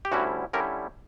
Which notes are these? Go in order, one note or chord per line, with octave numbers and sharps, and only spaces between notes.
G4
D2 D3 G3 C#4 E4 F#4
D3 G3 C#4 E4 A#4